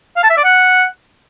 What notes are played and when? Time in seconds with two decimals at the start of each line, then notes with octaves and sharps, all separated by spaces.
0.17 F5
0.23 A5
0.30 E5
0.37 D5
0.44 F#5